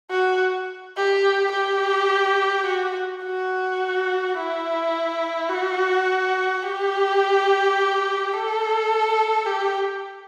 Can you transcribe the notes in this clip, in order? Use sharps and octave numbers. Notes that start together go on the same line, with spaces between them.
F#4
G4
G4
F#4
F#4
E4
F#4
G4
A4
G4